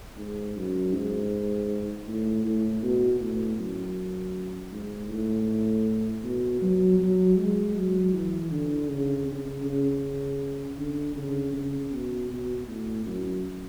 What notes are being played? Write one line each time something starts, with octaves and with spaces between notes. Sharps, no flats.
G#2
F#2
G#2
A2
A2
B2
A2
F#2
G#2
A2
B2
F#3
F#3
G#3
F#3
E3
D3
C#3
C#3
C#3
D3
C#3
C#3
B2
B2
A2
F#2